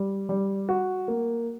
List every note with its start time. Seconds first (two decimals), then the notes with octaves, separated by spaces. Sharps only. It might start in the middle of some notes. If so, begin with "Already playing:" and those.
Already playing: G3
0.29 G3
0.69 F#4
1.08 A#3